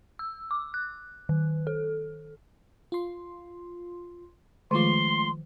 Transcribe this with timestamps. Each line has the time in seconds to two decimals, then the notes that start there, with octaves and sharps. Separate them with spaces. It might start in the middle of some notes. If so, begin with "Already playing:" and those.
0.19 E6
0.51 D6
0.74 F#6
1.29 D#3
1.67 A4
2.92 F4 C6
4.71 D#3 F3 G#3 A3 F4 C6